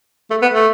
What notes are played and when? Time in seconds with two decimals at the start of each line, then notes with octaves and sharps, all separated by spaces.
0.30 A3
0.42 B3
0.53 A3